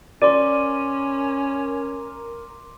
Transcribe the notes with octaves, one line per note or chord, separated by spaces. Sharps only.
C#4 A#4 D5 C6 D6 D#7